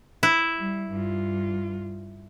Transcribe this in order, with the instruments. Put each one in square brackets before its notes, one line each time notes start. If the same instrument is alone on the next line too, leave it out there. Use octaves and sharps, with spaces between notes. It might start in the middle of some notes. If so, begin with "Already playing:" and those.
[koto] E4
[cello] G3
G2 F4